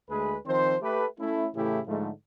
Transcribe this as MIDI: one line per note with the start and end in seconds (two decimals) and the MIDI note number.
0.10 0.36 38
0.10 0.36 56
0.10 0.36 57
0.10 0.36 68
0.10 0.36 71
0.46 0.76 51
0.46 0.76 53
0.46 0.76 60
0.46 0.76 72
0.82 1.06 57
0.82 1.06 67
0.82 1.06 71
1.19 1.47 57
1.19 1.47 61
1.19 1.47 64
1.55 1.80 45
1.55 1.80 49
1.55 1.80 52
1.55 1.80 57
1.55 1.80 64
1.55 1.80 67
1.87 2.10 44
1.87 2.10 50
1.87 2.10 53
1.87 2.10 56
1.87 2.10 57